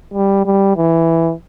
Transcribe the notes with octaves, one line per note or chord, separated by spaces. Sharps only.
G3
G3
E3